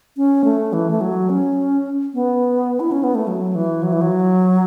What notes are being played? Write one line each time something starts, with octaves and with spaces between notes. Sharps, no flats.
C#4
A3
E3
A3
F#3
C#4
B3
E4
C#4
B3
A3
F#3
E3
F#3
E3
F#3